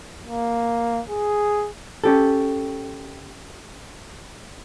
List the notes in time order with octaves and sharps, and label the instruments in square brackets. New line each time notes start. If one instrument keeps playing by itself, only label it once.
[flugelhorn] A#3
G#4
[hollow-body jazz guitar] C#4 G4 A4